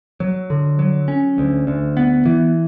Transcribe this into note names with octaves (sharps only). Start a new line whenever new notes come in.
F#3
D3
F#3
C#4
D2
D2
B3
E3